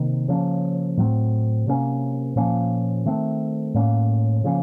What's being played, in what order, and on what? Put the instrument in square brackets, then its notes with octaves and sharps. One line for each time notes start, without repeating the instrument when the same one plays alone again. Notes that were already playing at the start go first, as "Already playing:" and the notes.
Already playing: [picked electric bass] C3 D#3 A#3
C#3 F3 A#3 C#4
A2 F#3 C4
C3 F#3 A#3 C#4
A#2 F3 A#3 C#4
D#3 A3 C4
A2 F#3 A#3 C#4
C#3 F3 A#3 C#4